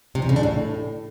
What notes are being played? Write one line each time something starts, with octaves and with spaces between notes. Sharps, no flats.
C3
E3
C#3
D4
A2